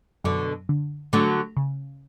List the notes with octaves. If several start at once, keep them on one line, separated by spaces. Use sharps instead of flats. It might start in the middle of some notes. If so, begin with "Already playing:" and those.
F#2 B2 D3
D3
D3 F#3 A3
C#3